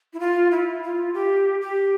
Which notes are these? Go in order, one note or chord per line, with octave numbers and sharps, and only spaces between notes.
E4
F4
E4
F4
G4
G4